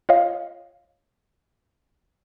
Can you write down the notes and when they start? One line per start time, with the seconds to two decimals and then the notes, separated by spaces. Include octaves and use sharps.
0.09 F4 C#5 D#5 F5